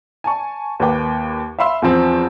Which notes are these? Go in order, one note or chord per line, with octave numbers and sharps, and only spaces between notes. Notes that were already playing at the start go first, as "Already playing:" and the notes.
G#5 A5 C#6
D#2 A#3 B4 G5 D6
E5 F5 B5 C6 E6
E2 F3 C4